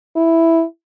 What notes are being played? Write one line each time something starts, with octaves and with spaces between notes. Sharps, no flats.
E4